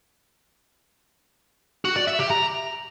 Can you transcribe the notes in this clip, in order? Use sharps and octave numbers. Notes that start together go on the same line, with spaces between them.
F#4
D5
E5
G4
A#5